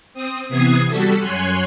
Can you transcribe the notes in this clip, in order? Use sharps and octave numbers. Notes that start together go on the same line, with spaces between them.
C4 D#6
C3 E3 B3 D#6 G#6 C7
G3 F#4 A4 B6
F#2 C#5 G#5 C6 F#6